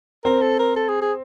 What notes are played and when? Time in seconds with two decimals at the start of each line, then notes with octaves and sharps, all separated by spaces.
0.25 C4 A#4
0.42 A4
0.59 A#4
0.76 A4
0.88 G#4
1.02 G#4